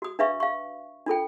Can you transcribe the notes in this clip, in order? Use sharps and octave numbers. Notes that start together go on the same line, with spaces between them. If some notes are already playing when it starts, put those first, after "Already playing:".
F#4 D#6
D4 B4 E5 F5 C#6
F5 C#6
D4 F4 A4 G5